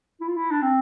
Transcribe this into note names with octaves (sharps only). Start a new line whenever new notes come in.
E4
F4
E4
D4
C4